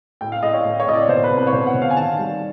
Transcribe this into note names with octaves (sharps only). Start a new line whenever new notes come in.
A2 G5
F5
A2 D#5
C#5
A2
C#5
A2 D#5
D5
B2 C5
B4
C2
B4
C#5
B2 C5
F#5
B2
F5
G#5
D#3 A5
G3